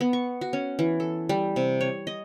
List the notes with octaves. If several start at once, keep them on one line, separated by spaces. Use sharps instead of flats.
B3
C#6
F#4
C#4
E3
A4
G3
C3
C#5
D#5